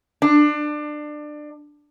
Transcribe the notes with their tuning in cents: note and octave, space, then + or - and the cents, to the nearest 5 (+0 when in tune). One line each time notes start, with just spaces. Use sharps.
D4 +25